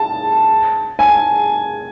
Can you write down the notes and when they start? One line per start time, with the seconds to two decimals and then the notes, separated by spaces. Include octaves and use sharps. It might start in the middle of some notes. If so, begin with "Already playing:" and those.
Already playing: A5
0.99 G#5